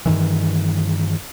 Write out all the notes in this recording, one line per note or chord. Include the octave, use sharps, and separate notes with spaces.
G2 D#3 E3